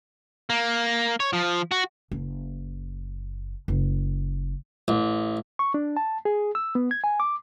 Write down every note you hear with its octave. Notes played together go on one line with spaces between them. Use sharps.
A#3
C#5
F3
F#4
F#1
F#1
A1
C#6
D4
A5
G#4
E6
B3
G#6
G#5
D6